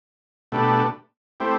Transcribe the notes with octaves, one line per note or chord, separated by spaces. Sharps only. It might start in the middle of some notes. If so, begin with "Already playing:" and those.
B2 A3 D4 G4 B4
A3 C4 E4 G4 C5